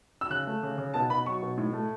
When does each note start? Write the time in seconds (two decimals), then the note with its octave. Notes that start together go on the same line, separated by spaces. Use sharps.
0.21 E6
0.30 C#3 F#6
0.47 A3
0.63 C#3
0.78 C#3
0.94 B2 A5
1.10 B2 B5
1.25 F#3 C#6
1.42 B2
1.58 A2
1.73 A3